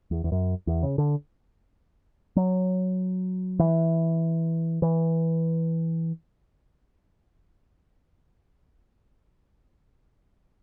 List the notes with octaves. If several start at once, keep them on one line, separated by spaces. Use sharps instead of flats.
E2
E2
F#2
E2
C#3
D3
F#3
E3
E3